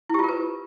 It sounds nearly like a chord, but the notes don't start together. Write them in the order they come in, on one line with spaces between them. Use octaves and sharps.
E4 G4 F4 A#4 B4